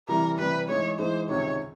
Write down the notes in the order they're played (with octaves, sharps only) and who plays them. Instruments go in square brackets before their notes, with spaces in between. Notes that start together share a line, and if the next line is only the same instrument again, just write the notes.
[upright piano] C3 E3 G3 [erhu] A#4
[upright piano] C3 E3 G3 [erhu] B4
[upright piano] G#2 E3 G#3 [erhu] C#5
[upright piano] G#2 E3 G#3 [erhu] C5
[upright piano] C#2 C3 D#3 [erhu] C#5